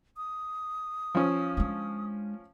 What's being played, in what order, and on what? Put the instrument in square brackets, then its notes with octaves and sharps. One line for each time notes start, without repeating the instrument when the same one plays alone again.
[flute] D#6
[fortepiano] F3 C#4
[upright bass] G#3 D4